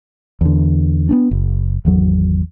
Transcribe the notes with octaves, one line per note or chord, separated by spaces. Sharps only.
E2 D3
B3 C#4 D4
F#1
G#1 E2 F#3